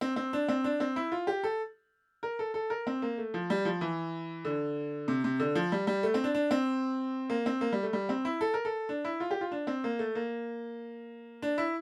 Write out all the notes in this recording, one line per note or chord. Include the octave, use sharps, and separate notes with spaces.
C4
C4
D4
C4
D4
C4
E4
F4
G4
A4
A#4
A4
A4
A#4
C4
A#3
A3
F3
G3
F3
E3
D3
C3
C3
D3
F3
G3
G3
A3
C4
D4
D4
C4
A#3
C4
A#3
G3
A3
G3
C4
E4
A4
A#4
A4
D4
E4
F4
G4
F4
D4
C4
A#3
A3
A#3
D4
E4